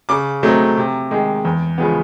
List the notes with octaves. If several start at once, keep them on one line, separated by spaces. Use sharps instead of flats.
C#3 D6
F#3 A3 C4 D#4
C3
D#3 G#3
E2
C#3 F3 G#3 B3